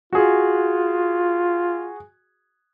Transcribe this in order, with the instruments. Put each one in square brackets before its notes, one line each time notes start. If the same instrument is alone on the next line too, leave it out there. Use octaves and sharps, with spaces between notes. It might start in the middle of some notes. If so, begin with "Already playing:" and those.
[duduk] F4 [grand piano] F#4 G#4